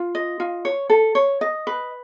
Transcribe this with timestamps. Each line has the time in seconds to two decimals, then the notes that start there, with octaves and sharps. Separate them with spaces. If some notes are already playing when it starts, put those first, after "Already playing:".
Already playing: F4
0.15 D#5
0.40 F4
0.65 C#5
0.90 A4
1.15 C#5
1.41 D#5
1.67 B4